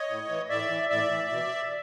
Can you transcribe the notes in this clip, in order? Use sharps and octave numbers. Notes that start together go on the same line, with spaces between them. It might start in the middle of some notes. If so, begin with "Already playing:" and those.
Already playing: C#5 D#5
A2
E3
A2 D5 E5
E3
A2 D5 E5
E3
B2